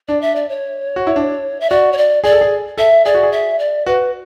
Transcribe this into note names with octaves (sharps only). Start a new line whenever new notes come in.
D4 D5
E5
D5
C#5
F#4
E4
D4
E5
F#4 D5
C#5
D5
G#4 D5
A4
G#4
A4 E5
G#4 D5
F#4
G#4
E5
D5
F#4 B4